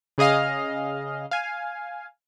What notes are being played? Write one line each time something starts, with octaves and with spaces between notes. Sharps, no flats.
C#3 G#4 D#5 F5 F6
F5 G#5